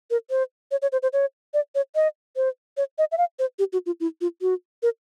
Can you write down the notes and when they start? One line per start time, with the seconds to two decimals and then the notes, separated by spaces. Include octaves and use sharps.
0.11 A#4
0.30 C5
0.71 C#5
0.82 C#5
0.92 C5
1.03 C5
1.13 C#5
1.54 D5
1.75 C#5
1.95 D#5
2.36 C5
2.77 C#5
2.98 D#5
3.12 E5
3.18 F5
3.39 C5
3.59 G4
3.73 F#4
3.86 F4
4.00 E4
4.21 F4
4.42 F#4
4.83 A#4